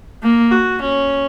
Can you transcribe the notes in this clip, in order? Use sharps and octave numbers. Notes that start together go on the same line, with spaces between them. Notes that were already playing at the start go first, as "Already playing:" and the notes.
A#3
F#4
C#4